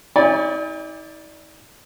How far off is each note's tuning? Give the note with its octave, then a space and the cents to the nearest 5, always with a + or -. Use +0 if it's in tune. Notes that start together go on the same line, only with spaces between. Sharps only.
D#4 +45 D5 -5 G#5 -45